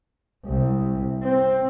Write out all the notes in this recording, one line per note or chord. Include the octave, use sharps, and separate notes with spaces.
C2
C4